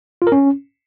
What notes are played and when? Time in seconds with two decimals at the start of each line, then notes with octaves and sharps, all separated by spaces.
0.22 F4
0.27 A#4
0.32 C#4